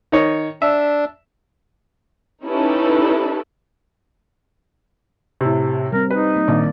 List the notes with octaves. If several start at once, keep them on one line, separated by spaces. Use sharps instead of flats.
D#3 D#4 C#5
D4 E5
C#4 D#4 E4 G4 A4 B4
A2 C3
G3 C4 A#4
D#4 B4
A#3
A#1 D#3 A#3 D5